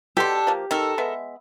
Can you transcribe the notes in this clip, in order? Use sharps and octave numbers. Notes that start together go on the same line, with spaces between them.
B2 D4 G4 A4 C6
F3 A#3
D#3 A4 A#4
G#3 B3 E5